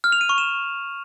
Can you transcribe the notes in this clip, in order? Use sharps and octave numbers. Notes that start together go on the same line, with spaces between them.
F6
F7
D#7
C#6
E7